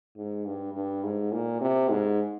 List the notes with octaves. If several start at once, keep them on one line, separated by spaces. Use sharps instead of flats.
G#2
G2
G2
G#2
A#2
C3
G#2